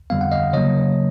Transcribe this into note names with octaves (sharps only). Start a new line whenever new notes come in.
F2 D3 G3 B3 F5
F#5
D#5 F5
C#3 F#3 A#3 C#5 D#5